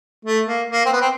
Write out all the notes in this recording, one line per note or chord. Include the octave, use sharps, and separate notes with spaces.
A3
A#3
A#3
C4
B3
C4